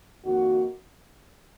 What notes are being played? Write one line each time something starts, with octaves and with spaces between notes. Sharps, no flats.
F2 D#3 A#3 F#4